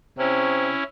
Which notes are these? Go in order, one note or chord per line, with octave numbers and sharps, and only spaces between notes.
C3 C#4 E4